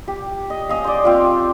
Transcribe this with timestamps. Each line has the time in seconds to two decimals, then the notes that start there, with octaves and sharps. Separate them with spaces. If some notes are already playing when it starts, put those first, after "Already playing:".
0.08 G4
0.50 D#5
0.69 C#4 D#5 F5
0.84 C5 D5
1.04 C4 F4 G4